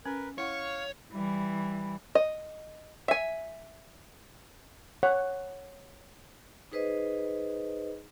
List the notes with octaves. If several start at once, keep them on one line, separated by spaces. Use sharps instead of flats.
C#4 A#4 B4
E4 C#5 F5 F#5 C#6
E3 G3
D#5
E5 G#5
C#5 F#5
D#4 G#4 B4 C5 D#5